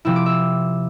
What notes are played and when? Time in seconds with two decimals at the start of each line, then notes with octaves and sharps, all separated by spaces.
0.05 C3 F3 C4 E4 E6
0.16 D6
0.26 E5 E6